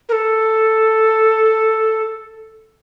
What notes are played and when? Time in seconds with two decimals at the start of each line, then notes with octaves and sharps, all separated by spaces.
0.09 A#4
0.12 A4